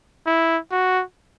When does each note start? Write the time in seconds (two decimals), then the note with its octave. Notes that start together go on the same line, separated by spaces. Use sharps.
0.27 E4
0.72 F#4